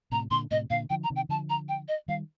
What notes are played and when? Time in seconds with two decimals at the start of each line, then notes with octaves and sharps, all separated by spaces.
0.12 A2 C3 A#5
0.31 A#2 D3 C6
0.51 A2 C3 D#5
0.70 A#2 D3 F5
0.90 D3 F3 G5
1.04 A#5
1.10 C3 D#3
1.16 G5
1.29 D3 F3 A5
1.50 A#5
1.69 G5
1.88 D#5
2.08 D#3 G3 F5